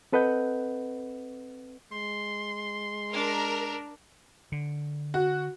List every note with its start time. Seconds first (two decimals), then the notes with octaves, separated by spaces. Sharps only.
0.12 C4 A4 B4 D#5 F#5 G6
1.92 G#3 C6
3.13 D4 A#4
4.52 D3
5.14 F#4